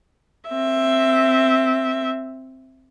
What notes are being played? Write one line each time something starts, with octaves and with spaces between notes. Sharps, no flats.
C4 E5